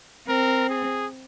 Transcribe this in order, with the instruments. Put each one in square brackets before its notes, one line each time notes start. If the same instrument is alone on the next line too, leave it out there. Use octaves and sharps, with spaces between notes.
[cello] C4 [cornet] A#4
[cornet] G#4